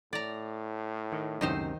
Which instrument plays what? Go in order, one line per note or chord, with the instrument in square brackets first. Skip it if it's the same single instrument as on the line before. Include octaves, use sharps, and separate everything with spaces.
[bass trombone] A2 [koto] D5 A#5
[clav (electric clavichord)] D#3
[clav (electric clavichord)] C#2 F#2 C3 [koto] D#3 D#4 C5